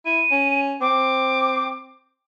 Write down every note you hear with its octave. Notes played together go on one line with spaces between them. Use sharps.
E4 D#7
C#4
C4 D6